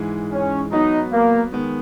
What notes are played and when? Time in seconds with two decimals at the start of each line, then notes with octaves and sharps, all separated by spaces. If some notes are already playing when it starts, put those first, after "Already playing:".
Already playing: G#2 E3 G#3
0.32 C#4
0.72 F#3 B3 D#4 F#4
1.13 A#3
1.52 D#3 G#3 B3